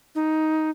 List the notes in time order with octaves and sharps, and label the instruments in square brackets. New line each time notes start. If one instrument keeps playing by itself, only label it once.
[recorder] D#4